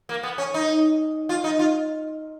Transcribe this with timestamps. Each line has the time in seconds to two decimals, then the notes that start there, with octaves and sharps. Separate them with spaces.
0.09 A#3
0.23 B3
0.38 C#4
0.54 D#4
1.29 F4
1.44 D#4
1.59 F4